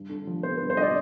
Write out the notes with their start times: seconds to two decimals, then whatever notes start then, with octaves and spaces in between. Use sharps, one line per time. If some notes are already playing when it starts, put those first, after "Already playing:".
Already playing: G2
0.09 D3
0.27 F3
0.43 B3 C5
0.57 G2 B4
0.70 C5
0.77 D3 D5 D#5